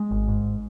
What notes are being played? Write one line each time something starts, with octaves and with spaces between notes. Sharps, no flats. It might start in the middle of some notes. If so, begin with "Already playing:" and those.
Already playing: G#3
G#1
G#2